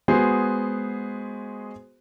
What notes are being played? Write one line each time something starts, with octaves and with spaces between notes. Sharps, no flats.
G#3 B3 F#4 G#4 C5